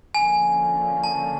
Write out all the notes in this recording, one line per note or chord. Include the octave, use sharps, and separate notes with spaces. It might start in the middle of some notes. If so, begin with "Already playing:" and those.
D3 F3 A#3 C#4 G#5
A5